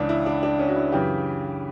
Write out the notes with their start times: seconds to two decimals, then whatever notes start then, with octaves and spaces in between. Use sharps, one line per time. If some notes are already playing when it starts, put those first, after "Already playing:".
Already playing: C#2 C#3 E3 D4
0.09 E4
0.26 D4
0.43 D4
0.59 C#4
0.68 F#4
0.76 E4
0.92 F#2 C#3 E3 G4